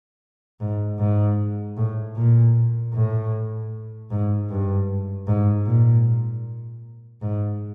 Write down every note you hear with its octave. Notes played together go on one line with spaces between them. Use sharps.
G#2
G#2
A2
A#2
A2
G#2
G2
G#2
A#2
G#2